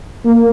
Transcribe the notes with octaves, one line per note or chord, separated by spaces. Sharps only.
A#3